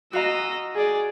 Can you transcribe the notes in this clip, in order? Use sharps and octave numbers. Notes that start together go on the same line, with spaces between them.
F#4 D#5 F5 A#5 E6
G#4 D5